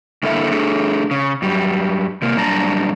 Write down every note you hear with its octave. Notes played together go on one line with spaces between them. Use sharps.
G2 D3 A#3 E4 A4 E5
A3 D4 G#4 A4
C#3
F#2 G3
C3 A#3
F#2 A#2 G3 D4 A5 A#5